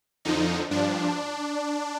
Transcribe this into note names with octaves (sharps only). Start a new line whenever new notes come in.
F2 D3 F3 D#4
G2 F3 D4